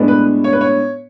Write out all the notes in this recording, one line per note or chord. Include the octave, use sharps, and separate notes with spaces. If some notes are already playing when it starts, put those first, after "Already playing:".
Already playing: A2 G#3 B3 D4
B4
C#5
B4
C#5